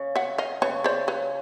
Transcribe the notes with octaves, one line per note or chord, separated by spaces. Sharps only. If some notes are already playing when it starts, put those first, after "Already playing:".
Already playing: C#3
E5 F#5
D#5 F5
C#3 B4 C#5
C5 D5
B4 C#5